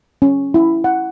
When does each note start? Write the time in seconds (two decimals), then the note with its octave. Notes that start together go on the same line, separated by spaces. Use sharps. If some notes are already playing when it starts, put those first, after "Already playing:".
0.22 C#4
0.54 E4
0.84 F#5